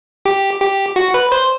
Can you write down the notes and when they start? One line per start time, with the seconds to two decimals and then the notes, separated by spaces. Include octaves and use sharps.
0.25 G4
0.61 G4
0.96 F#4
1.14 B4
1.32 C5